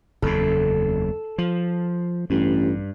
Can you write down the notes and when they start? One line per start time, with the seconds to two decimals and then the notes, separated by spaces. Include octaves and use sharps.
0.22 F#1 E2 C#3 A4
1.38 F3
2.30 A1 G2